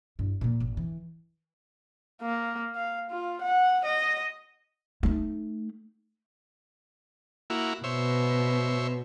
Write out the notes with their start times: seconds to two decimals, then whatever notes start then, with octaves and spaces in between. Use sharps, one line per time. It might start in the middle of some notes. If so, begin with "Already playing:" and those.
0.19 G2 E4
0.41 A#2 A#3
0.60 G#1
0.77 E3
2.22 A#3
2.75 F5
3.10 F4
3.42 F#5
3.85 D#5
5.03 A3 D#4
7.50 A#3 E4 F#4
7.84 B2 C5 C#5 E5